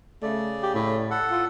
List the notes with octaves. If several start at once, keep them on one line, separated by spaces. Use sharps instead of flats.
C#3 A3 D5
G4
A2
A4 F#5
F4